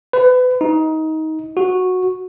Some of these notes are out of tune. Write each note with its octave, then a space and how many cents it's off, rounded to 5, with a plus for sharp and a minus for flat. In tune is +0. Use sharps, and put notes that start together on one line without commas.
B4 +30
D#4 +20
F#4 -10